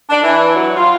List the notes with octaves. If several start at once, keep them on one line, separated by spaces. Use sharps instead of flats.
D4
E3
F#3
F4